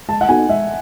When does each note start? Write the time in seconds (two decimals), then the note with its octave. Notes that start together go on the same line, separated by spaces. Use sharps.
0.09 G#3 A5
0.21 F#5
0.29 B3 D#4 F#4 A4 G#5
0.49 G#3 E5